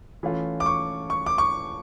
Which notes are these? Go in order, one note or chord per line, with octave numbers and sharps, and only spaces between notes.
E3 A3 C#4 F4
D6
C#6
C#6
D6
C#6